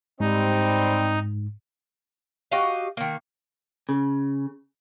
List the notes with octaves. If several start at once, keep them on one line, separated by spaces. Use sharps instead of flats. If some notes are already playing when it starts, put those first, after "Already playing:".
G#2 G3 C4 D#4
F#4 G4 D#5 F5
D#3 A#3
C#3